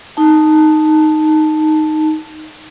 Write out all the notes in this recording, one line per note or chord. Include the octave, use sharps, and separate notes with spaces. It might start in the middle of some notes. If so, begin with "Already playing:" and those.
D#4 A5